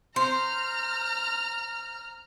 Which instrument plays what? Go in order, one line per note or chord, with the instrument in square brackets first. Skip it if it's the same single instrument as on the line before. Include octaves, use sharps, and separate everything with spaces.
[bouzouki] C5 [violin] A#5 F6